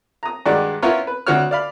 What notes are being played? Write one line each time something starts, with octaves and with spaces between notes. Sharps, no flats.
A#5 D#6
G2 D#3 G#3 F#4 D5
B3 C#4 E4 F4 A#4 C#5
B4
D2 F#4 C#5 F6
D5 F5 B5